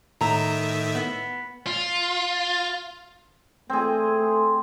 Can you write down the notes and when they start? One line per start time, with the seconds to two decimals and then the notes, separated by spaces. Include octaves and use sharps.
0.21 A2 D#3 E5 A#5
0.95 B3
1.67 F4
3.70 A3 C4 G#4